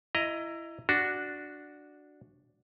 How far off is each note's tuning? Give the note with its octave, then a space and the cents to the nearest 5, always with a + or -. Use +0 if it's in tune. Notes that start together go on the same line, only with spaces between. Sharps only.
E4 +20 D#5 +0 A#5 +0
D4 +0 F#4 +0